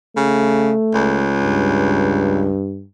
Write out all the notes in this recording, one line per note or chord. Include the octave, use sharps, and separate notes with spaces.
C#3 A3
C#2
G2